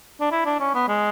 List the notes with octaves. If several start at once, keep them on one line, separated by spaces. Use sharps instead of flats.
D4
E4
D4
C#4
B3
G#3